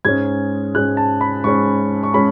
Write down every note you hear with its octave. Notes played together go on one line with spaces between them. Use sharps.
G#2 G#3 C#4 G#6
G#2 G#3 C#4 F#6
A5
B5
G#2 G#3 C#4 C#6
C#6
G#3 C#4 B5